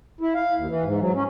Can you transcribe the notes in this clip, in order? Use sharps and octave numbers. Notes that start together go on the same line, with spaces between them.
E4
F5
D#2
E3
G#2
F#3
C#4